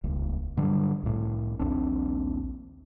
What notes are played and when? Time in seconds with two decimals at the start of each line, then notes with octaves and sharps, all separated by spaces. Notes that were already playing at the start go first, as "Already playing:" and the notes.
0.04 D#1 C#2
0.57 G2 D3 F#3 G3
1.03 C2 A2
1.59 A#1 D#2 C4 D4